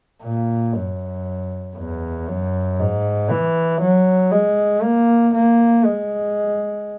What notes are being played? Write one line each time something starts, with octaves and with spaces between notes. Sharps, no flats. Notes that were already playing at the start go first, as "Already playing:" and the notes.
A#2
F#2
E2
F#2
G#2
E3
F#3
G#3
A#3
A#3
G#3